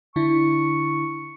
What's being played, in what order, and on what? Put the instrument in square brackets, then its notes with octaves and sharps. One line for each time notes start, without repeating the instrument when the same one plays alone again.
[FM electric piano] D3 D4 E4 [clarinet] C#6